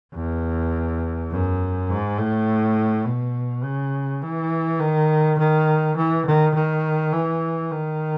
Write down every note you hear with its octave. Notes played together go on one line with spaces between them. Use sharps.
E2
F#2
G#2
A2
B2
C#3
E3
D#3
D#3
E3
D#3
D#3
E3
D#3